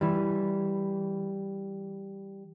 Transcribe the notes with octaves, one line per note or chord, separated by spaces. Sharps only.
E3 G3